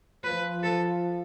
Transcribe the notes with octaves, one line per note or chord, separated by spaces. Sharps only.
F3 B4
A4